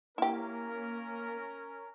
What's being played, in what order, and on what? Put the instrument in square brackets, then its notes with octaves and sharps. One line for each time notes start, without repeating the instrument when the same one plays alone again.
[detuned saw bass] A#3 [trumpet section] C#4 A#4 [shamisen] E4 G4